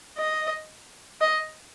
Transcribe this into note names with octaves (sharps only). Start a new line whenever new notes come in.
D#5
D#5